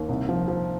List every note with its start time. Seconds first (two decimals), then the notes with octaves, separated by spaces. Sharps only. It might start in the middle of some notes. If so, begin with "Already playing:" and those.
Already playing: D#2
0.09 C2
0.29 F3
0.48 F3